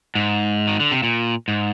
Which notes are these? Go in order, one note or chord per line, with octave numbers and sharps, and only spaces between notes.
G#2
D#3
D3
C3
A#2
G#2